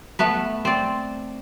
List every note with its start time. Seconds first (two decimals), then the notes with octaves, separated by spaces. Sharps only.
0.19 A3 B3 B4
0.65 C4 D5